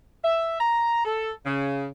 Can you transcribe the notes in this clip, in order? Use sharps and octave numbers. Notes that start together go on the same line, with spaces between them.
E5
A#5
A4
C#3